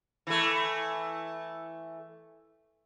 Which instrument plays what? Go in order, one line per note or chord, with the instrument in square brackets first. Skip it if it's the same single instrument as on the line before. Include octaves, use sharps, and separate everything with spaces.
[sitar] E3 A3